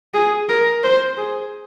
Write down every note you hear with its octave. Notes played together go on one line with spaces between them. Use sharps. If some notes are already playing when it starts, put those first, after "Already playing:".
G#4
A#4
C5
G#4